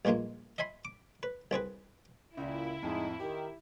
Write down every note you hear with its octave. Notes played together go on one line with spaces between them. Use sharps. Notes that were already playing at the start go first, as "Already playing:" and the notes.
A#1 G2 G#3 A#3 F4
D#5 E5 G#5 B5 C6
D6
B4
C2 C4 G#4 B4
C#2 A#2 E4
F2 A2 G#3 D#4
D#3 G4